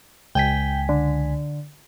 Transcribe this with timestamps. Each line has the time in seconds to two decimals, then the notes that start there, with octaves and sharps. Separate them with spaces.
0.35 C#2 G5 G#5 B6
0.89 D3